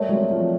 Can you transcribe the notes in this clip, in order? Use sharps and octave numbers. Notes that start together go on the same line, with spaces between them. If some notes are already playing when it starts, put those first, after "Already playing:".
Already playing: G3 A3 A#4 C#5 E5
F#3 G#3
F3